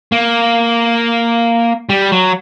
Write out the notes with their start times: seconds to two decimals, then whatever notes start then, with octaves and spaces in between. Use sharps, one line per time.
0.12 A#3
1.89 G3
2.12 F#3